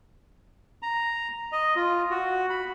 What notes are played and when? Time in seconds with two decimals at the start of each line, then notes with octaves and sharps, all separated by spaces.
0.82 A#5
1.52 D#5
1.76 F4
2.10 F#4
2.50 B5